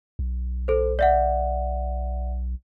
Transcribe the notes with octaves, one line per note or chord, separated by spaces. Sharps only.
B1
A4 C5
D5 E5 F#5